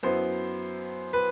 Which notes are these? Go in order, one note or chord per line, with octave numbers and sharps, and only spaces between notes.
F#2 F#3 B3 E4 C5
B4